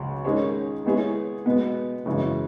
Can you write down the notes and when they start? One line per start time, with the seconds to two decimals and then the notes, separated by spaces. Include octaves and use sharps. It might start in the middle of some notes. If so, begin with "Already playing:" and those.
Already playing: C#2 C#3 F#3
0.25 D#3 G#3 C#4 G#4 C#5
0.85 G#3 B3 E4 G#4 C#5
1.46 B2 G#3 B3
2.06 F#2 C#3 E3 G#3